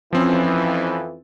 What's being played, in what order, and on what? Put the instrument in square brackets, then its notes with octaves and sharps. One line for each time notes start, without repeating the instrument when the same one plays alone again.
[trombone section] F2 E3 [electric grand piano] F3 C4 C#4